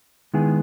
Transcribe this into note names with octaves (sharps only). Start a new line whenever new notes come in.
D#3 G#3 B3 E4 G#4